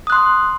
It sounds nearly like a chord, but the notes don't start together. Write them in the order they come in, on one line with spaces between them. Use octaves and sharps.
D#6 F#6 C6